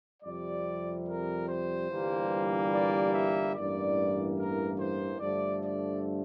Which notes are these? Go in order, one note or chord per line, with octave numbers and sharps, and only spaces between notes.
F2 C3 G3 D5
A#4
C5
G1 G2 E3 G3 A#3
D5
E5
A1 G2 E3 A#3 D5
A#4
C5
G2 D3 F3 A3 D5
D5